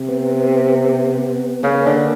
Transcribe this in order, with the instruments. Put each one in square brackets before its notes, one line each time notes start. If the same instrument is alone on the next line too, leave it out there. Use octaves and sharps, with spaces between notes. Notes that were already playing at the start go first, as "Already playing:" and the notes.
Already playing: [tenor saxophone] C3
[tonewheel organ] B3
[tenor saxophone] C#3 [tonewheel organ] A#3
[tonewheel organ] B3
A#3
[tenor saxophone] D3